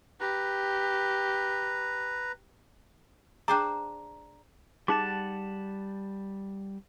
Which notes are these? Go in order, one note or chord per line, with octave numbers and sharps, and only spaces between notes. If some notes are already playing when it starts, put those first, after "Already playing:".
G4 B4 A#5
D4 G#4 C5 D5 G5 A#5
G3 D#4 G#4 F#5 A5 D6